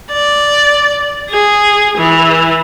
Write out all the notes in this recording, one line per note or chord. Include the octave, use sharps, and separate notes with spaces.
D5
G#4
E3